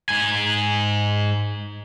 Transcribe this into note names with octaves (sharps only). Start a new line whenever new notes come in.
G#2 G#5